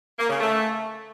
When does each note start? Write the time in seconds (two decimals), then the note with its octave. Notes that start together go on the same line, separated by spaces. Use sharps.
0.19 A#3
0.29 C#3
0.40 A3